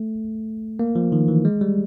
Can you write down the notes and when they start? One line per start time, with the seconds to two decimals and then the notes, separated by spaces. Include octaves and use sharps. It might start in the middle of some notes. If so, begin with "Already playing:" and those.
Already playing: A3
0.79 A#3
0.95 F3
1.12 D#3
1.28 E3
1.45 G#3
1.61 G3